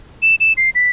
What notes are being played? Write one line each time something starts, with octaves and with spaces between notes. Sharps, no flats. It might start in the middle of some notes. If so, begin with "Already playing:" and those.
E7
E7
C7
B6